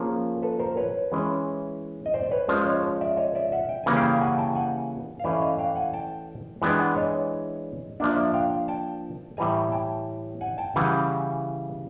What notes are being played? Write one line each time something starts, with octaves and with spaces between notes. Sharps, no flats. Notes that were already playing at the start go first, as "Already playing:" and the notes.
Already playing: F3 A#3 C#4 G#4 A#4
A4 B4
A#4 C5
B4 C#5
E3 G#3 C#4
D#5
C5 D5
B4 C#5
F3 G#3 C#4 C5 D5
C#5 D#5
D5 E5
C#5 D#5
D5 E5
E5 F#5
G5
C#3 E3 G3 A#3 C#4 G#5
F5 G5
F#5 G#5
G5 A5
F#5 G#5
F5
E3 A3 C#4 D5 E5
D#5 F5
F5 G5
F#5 G#5
G5 A5
E3 G#3 B3 D4 G5 A5
F#5 G#5
C#5 D#5
F3 A#3 D4 D5 E5
D5 E5
F5 G5
G5 A5
A2 E3 G3 G#5 A#5
G5 A5
F#5 G#5
G5 A5
C#3 E3 G3 F#5 G#5